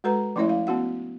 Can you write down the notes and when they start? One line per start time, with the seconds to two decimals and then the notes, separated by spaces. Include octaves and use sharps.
0.04 G#3 F#4 A4 B4 A#5
0.36 F3 A3 C#4 E4 C#5 E5
0.49 F5
0.67 B3 C#4 F#4 F#5